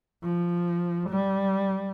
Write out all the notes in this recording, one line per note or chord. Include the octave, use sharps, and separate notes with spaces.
F3
G3